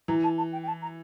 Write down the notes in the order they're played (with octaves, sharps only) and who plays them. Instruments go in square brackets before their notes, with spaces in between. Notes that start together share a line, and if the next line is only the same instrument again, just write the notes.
[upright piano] E3 [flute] A#5
[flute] A5
A5
G5
G5
A5
A#5